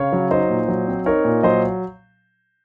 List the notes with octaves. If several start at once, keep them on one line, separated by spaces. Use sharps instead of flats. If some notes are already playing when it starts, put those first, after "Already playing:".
Already playing: C#3 C#5 F5
F#3
D#4 C5 D#5
A#2
F#3
C4
D#4 A#4 C#5
A#2
F#3 C5 D#5